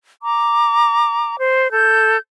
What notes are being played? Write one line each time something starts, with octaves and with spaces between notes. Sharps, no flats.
A#5 D6
C5
A4 G6